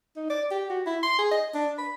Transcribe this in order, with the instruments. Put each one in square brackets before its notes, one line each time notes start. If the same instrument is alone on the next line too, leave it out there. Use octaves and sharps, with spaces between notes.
[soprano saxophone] D#4
D5
G4
F#4
E4
C6
G#4
D#5
D4
B5